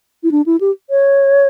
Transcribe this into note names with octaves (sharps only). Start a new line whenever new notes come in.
E4
D4
E4
G4
C#5